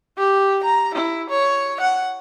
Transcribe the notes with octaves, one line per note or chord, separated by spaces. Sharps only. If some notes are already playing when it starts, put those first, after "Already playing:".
G4
A#5
E4
C#5
F#5